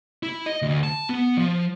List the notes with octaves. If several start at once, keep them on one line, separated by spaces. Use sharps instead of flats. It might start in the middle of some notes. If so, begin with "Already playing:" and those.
E4
D#5
D2
A5
B3
F3